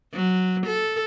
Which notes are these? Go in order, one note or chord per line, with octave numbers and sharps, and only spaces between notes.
F#3
A4